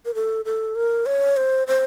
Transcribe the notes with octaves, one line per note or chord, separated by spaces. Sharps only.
A#4
A4
A4
A#4
C#5
C5
C5